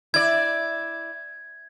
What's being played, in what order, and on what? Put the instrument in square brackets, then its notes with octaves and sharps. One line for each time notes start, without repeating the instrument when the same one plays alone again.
[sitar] E4 D5 [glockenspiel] G#6